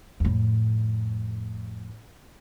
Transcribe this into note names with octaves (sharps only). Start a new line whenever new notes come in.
F2 A2